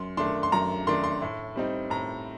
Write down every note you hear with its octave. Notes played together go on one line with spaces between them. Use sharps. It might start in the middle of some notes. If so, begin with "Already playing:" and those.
Already playing: F#2 C6
D#3 A3 D4 C6
C6
F#2 A#5
D#3 A3 D4 C6
C6
A2
G3 C4 D#4
A2 A#5